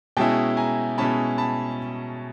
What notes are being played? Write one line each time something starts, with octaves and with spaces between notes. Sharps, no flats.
B2 G#3 C#4 E4 G5 A5
G#5 A#5
B2 G#3 C#4 E4 A5 B5
A5 B5